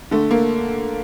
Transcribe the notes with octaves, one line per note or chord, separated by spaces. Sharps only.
D3 A3
A#3